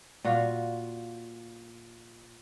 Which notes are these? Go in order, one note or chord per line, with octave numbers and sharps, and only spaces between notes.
A#2 F4 F#4